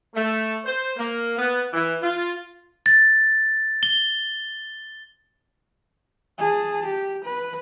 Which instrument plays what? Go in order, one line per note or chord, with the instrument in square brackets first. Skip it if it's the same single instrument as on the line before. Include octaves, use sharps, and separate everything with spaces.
[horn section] A3
C5
A#3
B3
E3
F4
[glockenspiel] A6
G7
[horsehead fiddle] G#4 A5
G4
B4